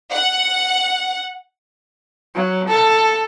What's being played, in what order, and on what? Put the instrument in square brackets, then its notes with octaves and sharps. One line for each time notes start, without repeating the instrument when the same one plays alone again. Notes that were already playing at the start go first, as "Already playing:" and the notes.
[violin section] F#5
[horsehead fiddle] F#3
A4